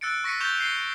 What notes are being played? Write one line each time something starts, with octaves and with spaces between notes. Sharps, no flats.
E6 F#6 A6 C#7 D7
C#6 A#6 B6 C#7 D#7
C#6 G6 A6 E7 F7 G7
C7 G7